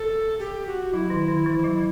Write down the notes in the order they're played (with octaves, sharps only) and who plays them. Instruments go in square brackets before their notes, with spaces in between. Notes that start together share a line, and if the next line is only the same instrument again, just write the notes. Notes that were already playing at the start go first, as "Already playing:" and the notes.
Already playing: [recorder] A4
G4
F#4
[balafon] F#3 [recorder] E4
[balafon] D#3
D#3
E3
F#3